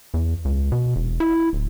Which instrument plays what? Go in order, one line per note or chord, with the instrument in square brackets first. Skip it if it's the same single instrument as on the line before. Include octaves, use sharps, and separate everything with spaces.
[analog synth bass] E2
C#2
B2
E1
E4
D1